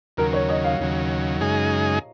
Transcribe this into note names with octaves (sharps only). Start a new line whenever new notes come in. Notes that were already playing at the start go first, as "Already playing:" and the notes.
D#2 C#3 F#3 A#4
C#5
D#5
F5
D#2 C#3 F#3
F#2 C#3 G#3 D#4 G#4